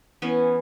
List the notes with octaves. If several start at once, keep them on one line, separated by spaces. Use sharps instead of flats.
E3 B3 C#4